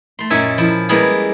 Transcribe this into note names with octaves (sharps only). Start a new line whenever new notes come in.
A3 C6
F#2 A#2 C#4 D#4 E5 G#5
F3 E4
G3 G#3 A#3 B3 E4 G#4